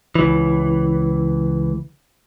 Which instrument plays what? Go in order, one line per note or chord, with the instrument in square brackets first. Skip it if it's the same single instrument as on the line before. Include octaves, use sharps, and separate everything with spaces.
[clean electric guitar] C#2 E3